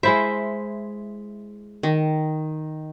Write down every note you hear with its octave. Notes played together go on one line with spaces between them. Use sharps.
G#3 E4 C5 E5
D#3